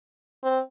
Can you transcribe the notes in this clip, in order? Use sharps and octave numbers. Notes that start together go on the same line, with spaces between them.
C4